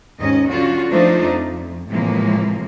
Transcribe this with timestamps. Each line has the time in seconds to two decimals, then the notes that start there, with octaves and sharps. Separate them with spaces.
0.19 D#2 G#2 C#4 D#5
0.50 D3 F#3 C#4 F4 F#4
0.90 F3 A3 D4 D#4 F4 C5
1.26 F2
1.90 A2 C3 E3 F3 G#3 A#3